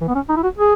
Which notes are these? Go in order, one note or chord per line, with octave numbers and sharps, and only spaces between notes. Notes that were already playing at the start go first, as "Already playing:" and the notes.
E3
B3
C#4
D#4
E4
F#4
G#4